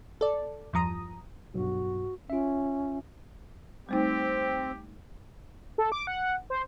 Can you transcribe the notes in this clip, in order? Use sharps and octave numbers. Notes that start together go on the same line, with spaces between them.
A4 D5
E2 G2 F3 A#5 D#6
B1 G2 F#4
C#4 F4 E5
G3 A3 C4 D#4 G4
A4
D6
F#5
C5